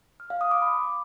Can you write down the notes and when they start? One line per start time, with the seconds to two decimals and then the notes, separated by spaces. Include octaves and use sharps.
0.20 F6
0.30 F5
0.41 D#6
0.51 D6
0.62 B5